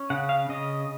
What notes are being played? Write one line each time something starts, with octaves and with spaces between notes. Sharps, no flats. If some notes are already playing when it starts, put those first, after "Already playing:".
Already playing: C#4
C#3 F#5
F5
C#3 D#5